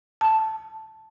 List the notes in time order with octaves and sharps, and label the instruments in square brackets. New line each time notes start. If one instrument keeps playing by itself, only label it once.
[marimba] A5